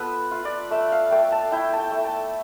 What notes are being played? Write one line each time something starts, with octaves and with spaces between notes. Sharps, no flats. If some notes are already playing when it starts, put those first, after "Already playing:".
Already playing: B3 F4 A4 B4
F4
D5
A3 E5
F5
A3 G5
A5
E4 G5
A5
G5
A3
A5